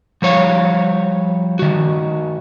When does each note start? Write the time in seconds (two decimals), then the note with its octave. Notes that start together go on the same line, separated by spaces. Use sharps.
0.22 F3 G3 C#5 F5
1.59 D#3 F#4